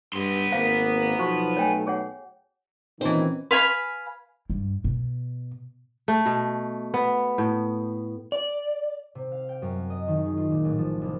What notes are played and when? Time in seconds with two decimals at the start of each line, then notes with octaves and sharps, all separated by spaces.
0.13 G2 B3 C6
0.52 G#1 A#3 C5 F5
1.19 B1 F3 F#4 C5 C#6
1.57 B2 A3 C#5 G5 G#5
1.87 G#4 C#5 F#5
3.01 A#2 D#3 E3 C4 C#4 C5
3.51 B4 F5 G#5 B5
4.50 G2
4.84 B2
6.08 A3
6.26 B2
6.94 B3
7.38 A2
8.32 D5
9.15 C3
9.32 F5
9.49 G5
9.62 F#2
9.90 D#5
10.08 D#3
10.25 G#4
10.37 F4
10.51 A#2
10.65 A1
10.79 F3
11.02 C2